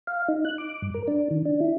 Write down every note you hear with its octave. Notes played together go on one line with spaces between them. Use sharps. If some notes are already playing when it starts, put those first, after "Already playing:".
F5
D#4
F#6
D6
G2
A#4
D4
D#3
D4
E4